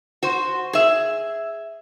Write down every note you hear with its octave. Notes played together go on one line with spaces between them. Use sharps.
F#4 C5
G#4 E5